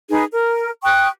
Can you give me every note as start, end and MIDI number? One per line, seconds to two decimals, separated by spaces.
0.09 0.23 63
0.09 0.23 68
0.09 0.23 71
0.31 0.69 70
0.83 1.08 79
0.83 1.08 85
0.83 1.08 87
0.83 1.08 90